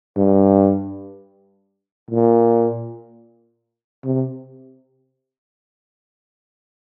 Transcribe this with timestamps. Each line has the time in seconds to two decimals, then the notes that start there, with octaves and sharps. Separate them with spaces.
0.17 G2
2.11 A#2
4.04 C3